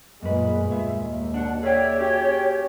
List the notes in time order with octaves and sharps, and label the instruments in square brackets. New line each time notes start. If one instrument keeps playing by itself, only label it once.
[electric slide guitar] F#2 B4 [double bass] A#2 G#3
[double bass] D#2 [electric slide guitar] G#3 E5
[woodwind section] B2 F#5 [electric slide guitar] D4
[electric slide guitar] G#4 G5 [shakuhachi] C#5 [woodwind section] D5 E5
[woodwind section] C#4 F#4 G4